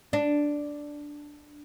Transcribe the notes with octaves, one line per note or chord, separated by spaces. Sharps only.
D4